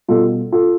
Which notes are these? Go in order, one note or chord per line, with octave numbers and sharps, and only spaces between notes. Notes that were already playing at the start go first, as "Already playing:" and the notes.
B2 G3 F4 A4
F4 A4